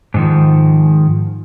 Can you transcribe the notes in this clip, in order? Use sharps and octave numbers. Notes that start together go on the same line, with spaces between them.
G#2 D#3 F3